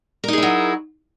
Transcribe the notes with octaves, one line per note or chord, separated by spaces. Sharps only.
F#3 D#4 E4 G#4 A#4